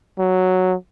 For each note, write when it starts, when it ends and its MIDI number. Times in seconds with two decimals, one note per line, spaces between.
0.19 0.75 54